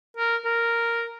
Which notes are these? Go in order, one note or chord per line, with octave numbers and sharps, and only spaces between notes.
A#4
A#4